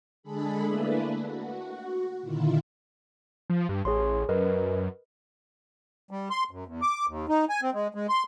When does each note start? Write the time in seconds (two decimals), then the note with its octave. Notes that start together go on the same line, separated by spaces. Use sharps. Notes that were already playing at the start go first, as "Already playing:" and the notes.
0.23 D3 G#3 D4 G#4 A4 B5
0.63 A3 A#3 D4 E4 B4
1.24 F#4
2.22 A#2 D3 D#3 E4 F4
3.50 F3
3.69 G2
3.85 A1 G#4 C#5 C6
4.29 F#2 A#4 B4 D#5
6.11 G3
6.30 C6
6.51 F#2
6.66 E2
6.82 D6
7.08 D#2
7.29 D#4
7.49 G#5
7.62 C4
7.74 G#3
7.95 G#3
8.09 C6